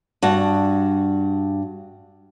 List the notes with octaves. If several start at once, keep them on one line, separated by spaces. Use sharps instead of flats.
G2 F#4